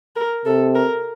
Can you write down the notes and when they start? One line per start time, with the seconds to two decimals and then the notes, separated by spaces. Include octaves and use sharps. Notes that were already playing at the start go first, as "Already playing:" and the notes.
0.16 A#4
0.45 C3 A4
0.75 A#4